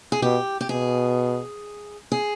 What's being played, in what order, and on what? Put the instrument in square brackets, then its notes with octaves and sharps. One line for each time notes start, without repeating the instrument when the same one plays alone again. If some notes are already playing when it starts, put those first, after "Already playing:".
[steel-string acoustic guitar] G#4
[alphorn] B2 [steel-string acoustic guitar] G4
[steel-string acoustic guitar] G4
[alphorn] B2 [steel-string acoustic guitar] G#4
[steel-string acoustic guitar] G#4